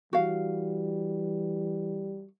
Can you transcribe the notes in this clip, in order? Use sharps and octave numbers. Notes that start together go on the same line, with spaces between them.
E3 G3 F#4 F5